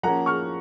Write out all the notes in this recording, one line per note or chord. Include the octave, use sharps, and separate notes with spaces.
F3 A#3 C#4 F#5 A#5
C#6 F6